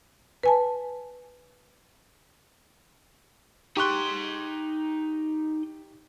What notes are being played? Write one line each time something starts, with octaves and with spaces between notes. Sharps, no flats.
B4 G#5 A5
D#4 G4 C6 C#6 F#6